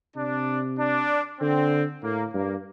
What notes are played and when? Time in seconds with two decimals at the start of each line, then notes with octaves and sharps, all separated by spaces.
0.16 C3 D4
0.78 D4
1.40 D3 C4
2.03 A2 A#3
2.34 G2 A#3